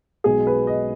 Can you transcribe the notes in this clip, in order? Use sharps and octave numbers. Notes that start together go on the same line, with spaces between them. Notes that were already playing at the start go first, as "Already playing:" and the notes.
B1 B2 G#3 G#4
B4
D#5